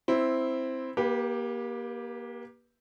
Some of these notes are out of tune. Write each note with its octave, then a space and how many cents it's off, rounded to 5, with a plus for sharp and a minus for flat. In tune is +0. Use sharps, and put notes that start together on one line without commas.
C4 +0 E4 +0
A#3 +25 G4 +0 B4 -20